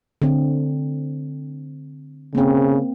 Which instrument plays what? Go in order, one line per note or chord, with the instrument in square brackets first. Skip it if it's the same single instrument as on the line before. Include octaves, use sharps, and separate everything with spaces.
[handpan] D3 C4
[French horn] C#3 [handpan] A#3 C4